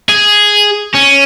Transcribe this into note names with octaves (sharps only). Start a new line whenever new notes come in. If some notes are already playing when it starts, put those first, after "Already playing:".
G#4
C#4